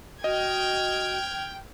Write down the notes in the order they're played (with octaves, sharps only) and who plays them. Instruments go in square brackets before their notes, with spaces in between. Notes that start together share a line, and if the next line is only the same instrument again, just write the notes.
[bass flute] F#4 [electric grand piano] D#5 [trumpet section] G5 [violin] F6 G#6